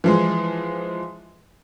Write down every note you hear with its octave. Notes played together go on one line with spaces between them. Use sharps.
E3 F3 G#3